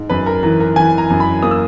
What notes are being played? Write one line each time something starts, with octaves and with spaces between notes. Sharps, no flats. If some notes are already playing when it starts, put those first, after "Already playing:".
Already playing: G#2
F#2 B4
A#4
E3 A#4
A#4
E3 G#5
A#5
F#2
B5
A#3 D#6
E6